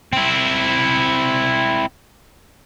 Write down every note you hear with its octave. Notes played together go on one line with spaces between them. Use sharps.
C4 E4